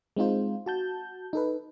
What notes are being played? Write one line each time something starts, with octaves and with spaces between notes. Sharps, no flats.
G#3 C4 D#4 F4 C5
F#4 A5 G6
D#4 A4 B4